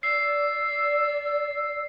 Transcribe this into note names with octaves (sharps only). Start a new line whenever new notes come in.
D5 E6 C7